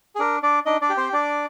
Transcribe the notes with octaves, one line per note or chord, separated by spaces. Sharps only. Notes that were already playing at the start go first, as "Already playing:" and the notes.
G#4
D4 A#4
D4 D5
D4 D#4 D#5
D4 D5
G4
C4 C5
D4 D5